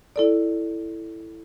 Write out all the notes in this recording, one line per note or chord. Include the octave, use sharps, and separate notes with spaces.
E4 A4 D5